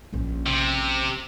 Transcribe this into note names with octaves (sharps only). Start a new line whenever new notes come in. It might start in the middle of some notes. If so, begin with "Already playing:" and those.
A#1 C#4
C3